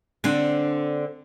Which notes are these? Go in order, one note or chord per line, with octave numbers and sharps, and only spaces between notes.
D3 C4 D4